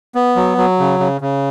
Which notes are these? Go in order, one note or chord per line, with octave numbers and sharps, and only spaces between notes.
B3
F#3
F#3
C#3
C#3
C#3